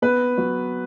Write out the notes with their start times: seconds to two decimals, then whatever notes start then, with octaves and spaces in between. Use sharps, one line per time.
0.02 B3 B4
0.38 F#3